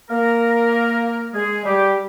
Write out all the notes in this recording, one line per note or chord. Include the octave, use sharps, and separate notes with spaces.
A#3 A#4
G#3 G#4
G3 G4